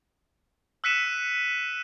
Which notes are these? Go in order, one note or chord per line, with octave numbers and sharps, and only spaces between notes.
E6 F#6 B6 C#7 D#7 E7